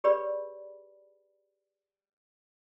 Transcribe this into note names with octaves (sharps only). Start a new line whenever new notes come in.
G4 G#4 B4 C#5 D5 B5